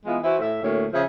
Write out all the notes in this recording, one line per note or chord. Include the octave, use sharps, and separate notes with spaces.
E3 G#3 B3 F4
E3 E4 F#4 C5
A2 E5
D2 A2 A#3 C#5
C#3 F3 G#4 E5